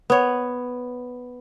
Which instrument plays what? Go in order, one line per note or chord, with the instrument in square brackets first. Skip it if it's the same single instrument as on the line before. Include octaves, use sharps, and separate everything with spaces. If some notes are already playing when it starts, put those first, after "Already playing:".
[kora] B3 C#5